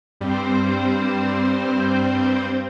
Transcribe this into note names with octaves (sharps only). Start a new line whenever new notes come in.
G2 G3 C4 C5